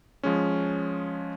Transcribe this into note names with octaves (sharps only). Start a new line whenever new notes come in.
F3 G#3 C#4